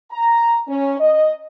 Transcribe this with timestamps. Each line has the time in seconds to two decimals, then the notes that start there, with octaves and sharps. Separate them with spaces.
0.12 A#5
0.68 C#4
1.00 D#5